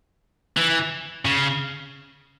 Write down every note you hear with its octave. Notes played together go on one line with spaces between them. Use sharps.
E3
C#3